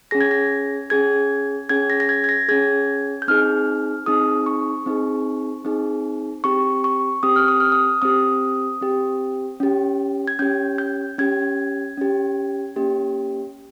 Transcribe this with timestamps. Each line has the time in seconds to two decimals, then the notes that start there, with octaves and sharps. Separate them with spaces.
0.11 C#4 G#4 A#6
0.21 G#6
0.31 A#6
0.90 C#4 G#4 G#6
1.69 C#4 G#4 G#6
1.90 A#6
2.00 A#6
2.09 G#6
2.24 G#6
2.29 A#6
2.48 C#4 G#4 G#6
3.22 G6
3.28 C4 D#4 G#4 F6
4.06 C4 D#4 G#4 D#6
4.46 C#6
4.86 C4 D#4 G#4
5.65 C4 D#4 G#4
6.44 C4 G4 C#6
6.84 C#6
7.23 C4 G4 D#6
7.36 F6
7.48 D#6
7.60 F6
7.72 D#6
8.02 C4 G4 D#6
8.82 C4 G4
9.60 C#4 G4
10.28 G#6
10.39 C#4 G4 G6
10.78 G6
11.18 C#4 G4 G#6
11.97 C#4 G4
12.76 A#3 C#4 G4